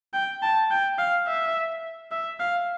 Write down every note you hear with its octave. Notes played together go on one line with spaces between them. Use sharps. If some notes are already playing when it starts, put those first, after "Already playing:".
G5
A5
G5
F5
E5
E5
F5